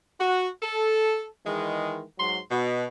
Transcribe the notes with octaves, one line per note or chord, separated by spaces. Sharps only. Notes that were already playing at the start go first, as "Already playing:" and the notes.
F#4
A4
D#3 E3 G#3
G#2 F#3 C6
B2